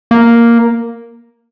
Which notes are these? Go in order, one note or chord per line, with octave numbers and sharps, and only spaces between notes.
A#3